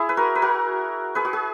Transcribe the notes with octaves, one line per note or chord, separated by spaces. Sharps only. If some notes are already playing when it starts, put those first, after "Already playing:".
Already playing: E4 G#4
B4
F#4 A#4
B4
F#4 A#4
G#4 B4
F#4
G#4